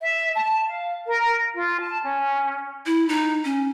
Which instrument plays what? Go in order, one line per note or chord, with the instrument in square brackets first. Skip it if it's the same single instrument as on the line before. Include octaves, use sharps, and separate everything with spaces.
[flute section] E5
A5
F5
A#4
F4
A5
C#4
[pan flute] E4
D#4
C#4